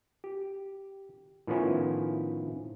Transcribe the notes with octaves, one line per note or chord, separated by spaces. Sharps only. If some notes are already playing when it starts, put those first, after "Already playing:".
G4
A2 D#3 F3 B3 C#4 E4